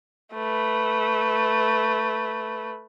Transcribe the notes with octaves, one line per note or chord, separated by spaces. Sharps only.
A3 B4